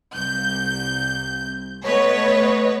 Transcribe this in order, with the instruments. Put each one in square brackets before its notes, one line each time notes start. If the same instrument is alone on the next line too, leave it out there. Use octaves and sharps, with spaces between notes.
[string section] C2 G6
A3 B3 B4 C#5 D#5